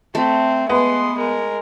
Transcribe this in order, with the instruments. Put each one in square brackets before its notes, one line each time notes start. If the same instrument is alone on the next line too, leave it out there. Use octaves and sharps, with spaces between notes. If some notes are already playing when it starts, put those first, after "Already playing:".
[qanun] A3 [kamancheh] C4
[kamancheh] G#3 C6 [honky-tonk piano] B3
[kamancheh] G#3 A#4